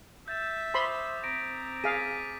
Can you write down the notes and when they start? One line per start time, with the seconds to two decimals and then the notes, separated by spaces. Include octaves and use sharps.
0.28 E5 G6 A6 E7
0.74 C5 B5 C6 D6 D#6
1.23 C4 A#5 A#6 B6 D7
1.84 G#4 F5 A6 B6 D#7